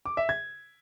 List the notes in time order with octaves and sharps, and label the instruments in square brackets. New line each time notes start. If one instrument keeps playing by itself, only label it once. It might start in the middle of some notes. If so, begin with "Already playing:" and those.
[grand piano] D6
E5
G#6